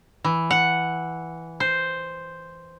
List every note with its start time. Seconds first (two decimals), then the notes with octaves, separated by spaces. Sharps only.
0.24 E3
0.51 F#5
1.60 C5